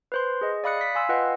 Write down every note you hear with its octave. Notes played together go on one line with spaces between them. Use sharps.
B4 C5 C6
G#4 D#5
D5 F5 B5 D#6 F#6 C#7
B6
F5 G#5 C6 E6
F4 B4 D#5 F#5 G5